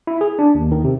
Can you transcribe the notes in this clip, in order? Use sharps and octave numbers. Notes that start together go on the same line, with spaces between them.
E4
G#4
D4
D#2
D#3
C3